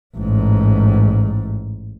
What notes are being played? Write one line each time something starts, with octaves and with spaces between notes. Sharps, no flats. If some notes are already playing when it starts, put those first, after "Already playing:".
A1 G#2